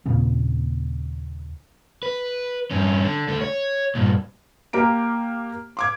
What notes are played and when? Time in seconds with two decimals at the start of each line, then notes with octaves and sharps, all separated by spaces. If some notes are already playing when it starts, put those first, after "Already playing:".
0.06 D#2 A#2 C#3 C4
2.03 B4
2.71 G2 C#4
3.04 D3
3.28 D3 A3
3.41 C#5
3.95 G2 A#2
4.73 A#3 G4 A#5 D7
5.77 C6 D6 G#6